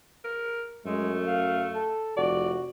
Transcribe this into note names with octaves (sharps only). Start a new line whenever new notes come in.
A#4
F#2 G#3 A3
F5
A4
F1 F#4 D5